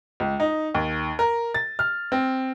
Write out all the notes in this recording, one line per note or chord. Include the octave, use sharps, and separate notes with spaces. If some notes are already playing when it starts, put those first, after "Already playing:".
C#2
D#4
D#2
A#4
A6
F6
C4